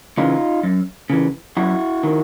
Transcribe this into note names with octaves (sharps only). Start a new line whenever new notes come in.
C#3 E3 D#4 F4
F#2
C#3 E3
F#2 E4 F#4
D#3